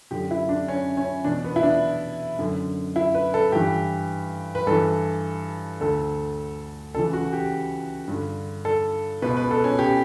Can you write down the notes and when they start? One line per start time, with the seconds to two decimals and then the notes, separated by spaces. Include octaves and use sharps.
0.11 F#2 D3 G4
0.31 E4
0.49 D4
0.68 C#4
0.97 C#4
1.25 E2 B2 D4
1.44 B3
1.56 E4
1.63 D4
2.39 F#2 D3
2.96 E4
3.15 B4
3.34 A4
3.52 G2 E3 G4
4.55 B4
4.67 G2 E3 A4
5.81 D2 D3 A4
6.94 C#2 C#3 E3 A4
7.13 F#4
7.33 G4
8.08 G2 D3
8.65 A4
9.22 C#2 B2 B4
9.37 B4
9.51 A4
9.64 C#4
9.79 G4